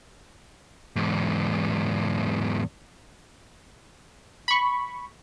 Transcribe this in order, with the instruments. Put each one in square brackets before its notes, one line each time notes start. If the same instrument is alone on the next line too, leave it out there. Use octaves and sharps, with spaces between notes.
[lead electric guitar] E2 G#2
[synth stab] B5 C#6